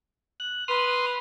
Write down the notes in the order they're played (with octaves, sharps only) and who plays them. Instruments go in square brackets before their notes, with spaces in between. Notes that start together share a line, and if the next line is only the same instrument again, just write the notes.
[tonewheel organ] F#6
[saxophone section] B4 [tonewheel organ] C6 D#6 F6